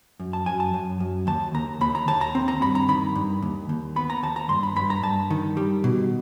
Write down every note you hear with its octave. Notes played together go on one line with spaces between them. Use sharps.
F#2
A5
F#2 G#5
A5
F#2
F#2
D#2 A5
D#2 A#5
D#2 B5
A#5
D#2 A5
A#5
C4
A#5
G2 B5
A#5
D#3 B5
G2
D#2
D#2
B3 B5
A#5
D#2 A5
A#5
G2 C6
B5
G2 B5
A#5
G2 A5
D#3
G3
B2